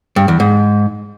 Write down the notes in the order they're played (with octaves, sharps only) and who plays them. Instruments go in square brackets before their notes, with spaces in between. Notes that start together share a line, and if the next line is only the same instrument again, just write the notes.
[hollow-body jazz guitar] G2
E2
G#2